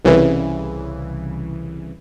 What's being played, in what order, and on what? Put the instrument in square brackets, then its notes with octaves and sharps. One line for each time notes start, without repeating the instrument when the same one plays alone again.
[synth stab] C2 C#3 E3